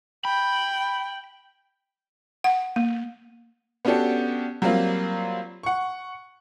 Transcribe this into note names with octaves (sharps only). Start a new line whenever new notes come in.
G5 B5
F#5
A#3
B3 C#4 D4 F#4 G4 A4
F#3 G3 A#3 C4 F4
F#5 C#6